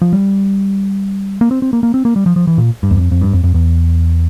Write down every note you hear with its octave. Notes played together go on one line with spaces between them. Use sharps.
F3
G3
A#3
C4
C4
A#3
A#3
C4
A#3
G3
F3
F3
E3
A#2
G2
E2
F2
F2
G2
F2
F2
E2